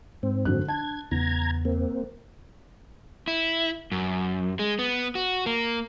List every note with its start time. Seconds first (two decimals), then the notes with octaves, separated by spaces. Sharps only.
0.23 G#2 C4
0.45 F#2 D3 F3 F#3 F#4 F#6
0.68 D4 A5 G#6
1.11 E2 C#3 B3 A#5 G#6
1.65 A#3 C4
3.28 E4
3.92 F#2
4.59 G#3
4.79 B3
5.15 F#4
5.46 A#3